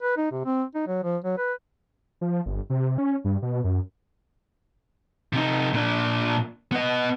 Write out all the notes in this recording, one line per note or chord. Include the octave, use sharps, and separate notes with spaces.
B4
D#4
C3
C4
D#4
F#3
F3
F#3
B4
F3
G1
C3
C#4
G2
B2
F#2
C3 D#4
A#2 D4
B3 D#5